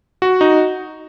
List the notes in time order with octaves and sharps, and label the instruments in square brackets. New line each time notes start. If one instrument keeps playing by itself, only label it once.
[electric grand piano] F#4
D#4